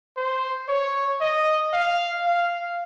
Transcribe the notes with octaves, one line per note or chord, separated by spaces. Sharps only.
C5
C#5
D#5
F5
F5